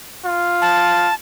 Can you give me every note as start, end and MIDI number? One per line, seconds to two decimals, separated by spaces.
0.25 1.10 65
0.62 1.14 81